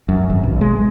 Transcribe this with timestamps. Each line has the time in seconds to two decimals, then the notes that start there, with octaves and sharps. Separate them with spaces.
0.09 F#2
0.30 G#1
0.43 B1
0.61 G#3